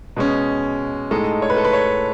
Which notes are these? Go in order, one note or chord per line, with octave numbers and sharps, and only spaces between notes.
B2 G#3 C#4
A2 G#3 D#4 A4
C#5
B4
A4
B4
C#5